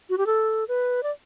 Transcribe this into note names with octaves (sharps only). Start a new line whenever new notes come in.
F#4
G4
A4
B4
D5